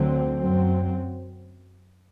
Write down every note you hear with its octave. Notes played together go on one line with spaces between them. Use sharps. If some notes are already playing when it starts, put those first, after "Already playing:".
Already playing: D2 D3 F#3 C4
F#2 F#3 C4